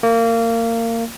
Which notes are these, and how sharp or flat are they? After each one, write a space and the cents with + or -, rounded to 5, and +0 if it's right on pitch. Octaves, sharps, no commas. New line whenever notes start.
A#3 -25